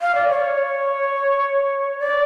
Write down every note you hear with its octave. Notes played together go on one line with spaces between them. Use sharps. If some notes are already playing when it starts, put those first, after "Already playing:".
F5
D5
C#5
D5